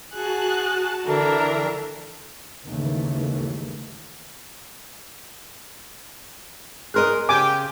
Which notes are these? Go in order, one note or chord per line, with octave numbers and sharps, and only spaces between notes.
F#4 G#4 A5 F#6
D3 E3 D4 A4 A#4 E5 A#5
D#2 G#2 C#3 E3 A3
G#4 A#4 D#5 C6 F6 F#6
C#3 G4 G5 G#5 D6